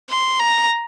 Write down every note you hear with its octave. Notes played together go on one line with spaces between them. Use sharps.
C6
A#5